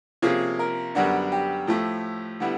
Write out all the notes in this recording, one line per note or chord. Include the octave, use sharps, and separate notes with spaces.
C3 F3 A#3 C#4 F4 G#4
A#4
F#2 D3 G3 B3 D4 F#4
G4
A2 F3 A3
D3 G3 B3 E4